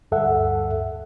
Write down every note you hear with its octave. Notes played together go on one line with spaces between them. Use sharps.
D2 G2 A4 E5 F#5